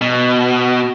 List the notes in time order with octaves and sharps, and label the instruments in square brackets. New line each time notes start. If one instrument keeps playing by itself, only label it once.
[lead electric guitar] B2